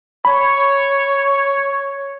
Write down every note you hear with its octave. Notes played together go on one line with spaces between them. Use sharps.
C#5 B5